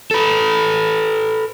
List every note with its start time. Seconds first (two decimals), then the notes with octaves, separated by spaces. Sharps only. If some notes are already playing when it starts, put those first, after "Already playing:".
0.11 A4 B4